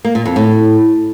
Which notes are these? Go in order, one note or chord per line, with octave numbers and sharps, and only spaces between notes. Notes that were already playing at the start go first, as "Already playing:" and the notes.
A#3
A#2
F2
A2